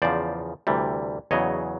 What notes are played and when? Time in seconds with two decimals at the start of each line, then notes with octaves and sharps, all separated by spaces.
0.02 E2 C#3 F3 C5 D5
0.67 D2 C3 E3 G3
1.31 E2 C#3 F#3 C#5 D#5